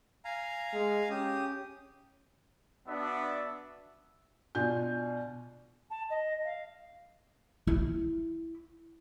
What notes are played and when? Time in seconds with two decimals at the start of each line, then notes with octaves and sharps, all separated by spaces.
0.25 F5 G#5 A#5
0.73 G#3
1.10 C#4 G4 D#6
2.88 B3 D4 F#4 D5 E5
4.55 B2 D4 F4 G#5 G6
5.90 A5
6.10 D#5
6.44 F5
7.67 E4